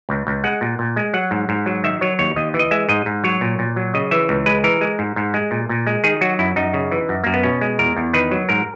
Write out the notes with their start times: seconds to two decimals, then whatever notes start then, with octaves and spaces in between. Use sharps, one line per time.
0.09 C#2
0.27 C#2
0.44 G#3 F#5
0.61 A#2
0.79 A#2
0.96 G#3
1.14 F#3 F#5
1.31 G#2
1.49 G#2
1.66 F#3
1.84 D#3 E5
2.01 F#3 C#5
2.19 D#2 C#5
2.36 D#2 D#5
2.54 E3
2.59 D#5
2.71 G#3 E5
2.89 G#2 D#5
3.06 G#2
3.24 F#3 C#5
3.41 A#2
3.59 A#2
3.76 F#3
3.94 C#3 D#5
4.11 E3 E5
4.29 C#2
4.46 G#3 B4
4.64 E3 A#4
4.81 G#3
4.99 G#2
5.16 G#2
5.34 G#3
5.51 A#2
5.69 A#2
5.87 G#3
6.04 D#3 G#4
6.21 F#3 F#4
6.39 F#2 E4
6.56 F#2 D#4
6.74 C#3
6.92 E3
7.09 F#2
7.24 F#2 A#3
7.34 B3
7.43 B2 C#4
7.61 G#3
7.79 E2 A#4
7.97 E2
8.13 D#3 B4
8.31 F#3
8.49 G#2 A#4